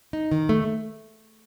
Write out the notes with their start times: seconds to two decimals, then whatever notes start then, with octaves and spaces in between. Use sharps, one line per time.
0.13 D#4
0.32 D#3
0.49 A3